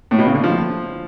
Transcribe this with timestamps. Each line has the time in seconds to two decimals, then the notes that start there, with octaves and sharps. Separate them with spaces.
0.11 A2
0.19 B2
0.26 C#3
0.35 D3
0.44 F3